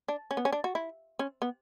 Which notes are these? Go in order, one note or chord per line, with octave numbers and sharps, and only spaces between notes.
D4
C#4
B3
C#4
D4
F#4
E4
C#4
B3